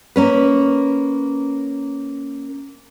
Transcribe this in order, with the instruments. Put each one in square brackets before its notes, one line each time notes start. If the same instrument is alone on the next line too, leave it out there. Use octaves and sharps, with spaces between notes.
[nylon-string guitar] A#3 C#4 B4